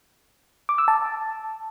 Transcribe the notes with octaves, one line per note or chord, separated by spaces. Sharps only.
D6
E6
A5